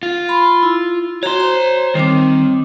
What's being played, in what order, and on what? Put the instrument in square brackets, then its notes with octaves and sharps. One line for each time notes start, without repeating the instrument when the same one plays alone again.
[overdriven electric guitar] F4
[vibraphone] B5 C6
E4
[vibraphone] F#4 A#5 [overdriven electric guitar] C#5 C6
[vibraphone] C5 A#5
[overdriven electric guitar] D#3 [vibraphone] G3 C4 D6